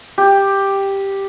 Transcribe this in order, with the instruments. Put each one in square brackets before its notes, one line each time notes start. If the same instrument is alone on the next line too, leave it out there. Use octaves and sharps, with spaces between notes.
[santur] G4